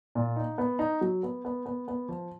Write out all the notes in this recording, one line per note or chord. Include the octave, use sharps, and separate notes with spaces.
A#2
D#4
B3
D#4
F#3
B3
B3
B3
B3
F3